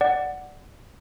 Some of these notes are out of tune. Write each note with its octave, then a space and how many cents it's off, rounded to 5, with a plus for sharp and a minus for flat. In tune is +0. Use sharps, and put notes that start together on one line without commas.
D5 +0 F#5 +0